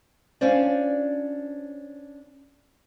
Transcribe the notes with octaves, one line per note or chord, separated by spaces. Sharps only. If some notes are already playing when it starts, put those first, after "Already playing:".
C#4 D4 F4 C5 D5